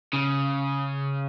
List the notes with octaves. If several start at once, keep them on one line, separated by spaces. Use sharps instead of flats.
C#3